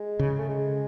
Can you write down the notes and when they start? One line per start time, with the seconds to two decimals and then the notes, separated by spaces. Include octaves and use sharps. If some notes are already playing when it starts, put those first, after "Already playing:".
Already playing: G#3
0.19 C#3
0.39 A3
0.49 G#3